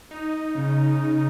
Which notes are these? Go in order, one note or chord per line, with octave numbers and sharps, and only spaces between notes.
D#4
D#4
C#3
C#3
C#3